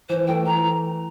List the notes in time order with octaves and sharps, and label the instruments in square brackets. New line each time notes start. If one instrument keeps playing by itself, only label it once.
[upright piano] E3 [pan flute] C5
[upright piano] A3 [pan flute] G5
[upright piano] E3 [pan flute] A#5